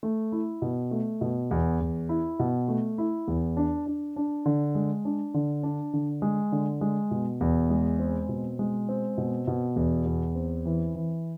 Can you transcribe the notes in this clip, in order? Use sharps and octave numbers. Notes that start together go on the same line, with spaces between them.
A3
E4
B2
A3
B2
E2
E2
E4
B2
A3
E4
E2
D4
D4
D4
D3
G#3
D4
D3
D4
D3
G#3
D3
G#3
B2
E2
G#3
C4
B2
G#3
C4
B2
B2
E2
E2
C4
E3
E3